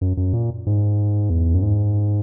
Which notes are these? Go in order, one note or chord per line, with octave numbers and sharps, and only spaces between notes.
F#2
F#2
A#2
G#2
E2
F#2
G#2